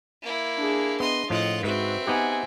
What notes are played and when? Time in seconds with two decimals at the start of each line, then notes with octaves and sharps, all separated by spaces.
0.22 A#3 E4
0.57 D4 G#4
1.00 B3 D#5 C6
1.30 A2 F3 F4 D#5 F#5
1.63 G#2 C4 F#4 B4 E5
2.07 B3 D#4 G4 F#5 G#5